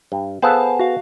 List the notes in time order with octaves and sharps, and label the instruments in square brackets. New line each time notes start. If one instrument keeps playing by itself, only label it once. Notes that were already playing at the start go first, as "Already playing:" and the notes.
[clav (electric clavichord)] G2
[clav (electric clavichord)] B3 G#4 A4 [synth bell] C5 F5 A5
[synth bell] F#4 F5